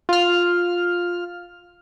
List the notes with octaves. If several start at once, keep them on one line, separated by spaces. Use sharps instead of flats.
F4 F6